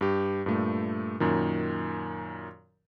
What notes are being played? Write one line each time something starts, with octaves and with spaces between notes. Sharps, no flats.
G2 G4
G2 A#2 A3
F#2 A#2 D#3